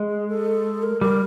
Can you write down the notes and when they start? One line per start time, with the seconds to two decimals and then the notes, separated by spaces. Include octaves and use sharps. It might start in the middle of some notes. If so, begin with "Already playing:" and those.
Already playing: G#3
0.09 G#4
0.28 A4
0.83 A#4
1.01 G3 A#4